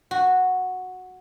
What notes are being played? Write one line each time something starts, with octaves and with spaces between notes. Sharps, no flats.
F#4